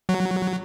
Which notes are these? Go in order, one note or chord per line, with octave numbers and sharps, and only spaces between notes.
F#3